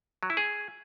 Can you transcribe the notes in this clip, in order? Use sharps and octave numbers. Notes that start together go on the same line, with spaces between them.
F#3
E4
G#4